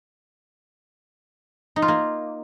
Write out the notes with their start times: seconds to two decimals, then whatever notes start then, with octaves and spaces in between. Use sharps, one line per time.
1.76 D#4
1.82 F4
1.88 A#3